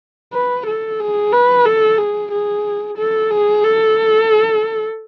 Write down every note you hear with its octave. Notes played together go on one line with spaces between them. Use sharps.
B4
A4
G#4
B4
A4
G#4
G#4
A4
G#4
A4